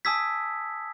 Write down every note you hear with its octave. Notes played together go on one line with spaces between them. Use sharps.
G#5 A5 D#6 E6 G#6 B6